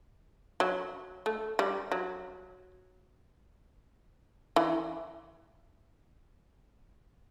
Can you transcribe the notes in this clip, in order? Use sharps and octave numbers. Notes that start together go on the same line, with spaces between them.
F#3
A3
G3
F#3
E3